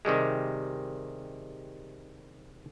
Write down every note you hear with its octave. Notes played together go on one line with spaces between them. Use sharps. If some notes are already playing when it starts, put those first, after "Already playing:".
C3 D#3 G3 G#3